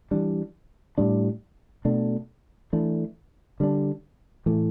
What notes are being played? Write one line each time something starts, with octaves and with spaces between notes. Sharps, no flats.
E3 G3 D4
A2 G3 D4
B2 A3 D4
E3 A3 D4
D3 G3 D4
A2 E3 A3